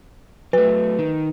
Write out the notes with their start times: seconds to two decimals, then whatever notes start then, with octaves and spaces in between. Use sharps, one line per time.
0.53 F#3 A3 B4
0.99 D#3